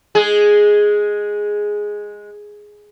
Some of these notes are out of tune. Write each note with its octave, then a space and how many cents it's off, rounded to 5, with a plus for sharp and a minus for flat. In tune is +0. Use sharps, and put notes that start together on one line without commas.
G#3 +0 G#4 +0